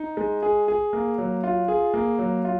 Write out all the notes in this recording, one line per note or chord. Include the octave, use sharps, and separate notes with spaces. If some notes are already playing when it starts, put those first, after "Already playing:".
Already playing: D#4
G#3
G#4
G#4
A#3
F#3
F4
G#4
A#3
F#3
F4